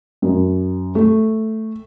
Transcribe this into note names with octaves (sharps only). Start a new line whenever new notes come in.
F#2
A3